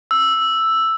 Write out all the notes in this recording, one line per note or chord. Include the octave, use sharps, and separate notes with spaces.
E6